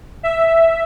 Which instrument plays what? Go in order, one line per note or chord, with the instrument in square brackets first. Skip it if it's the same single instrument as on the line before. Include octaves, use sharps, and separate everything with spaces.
[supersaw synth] E5